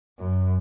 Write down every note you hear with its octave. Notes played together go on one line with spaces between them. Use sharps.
F#2